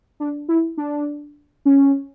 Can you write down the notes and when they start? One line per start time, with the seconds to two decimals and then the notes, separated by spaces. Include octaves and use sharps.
0.20 D4
0.49 E4
0.78 D4
1.65 C#4